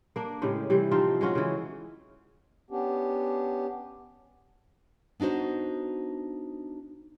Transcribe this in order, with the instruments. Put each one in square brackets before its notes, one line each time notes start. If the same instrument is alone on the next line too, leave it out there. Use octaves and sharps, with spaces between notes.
[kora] A#3 D4
A2 C#3 G#3 G4
C3 E3 G3
F3 C4 D#4 F4
G#3 C#4 F4 F#4
C#3 E3
[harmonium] B3 C#4 D4 G4
[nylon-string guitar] B3 D4 D#4 F#4 C5